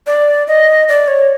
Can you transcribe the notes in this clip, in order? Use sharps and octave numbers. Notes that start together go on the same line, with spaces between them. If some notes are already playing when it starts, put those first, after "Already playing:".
D5
D#5
D5
C#5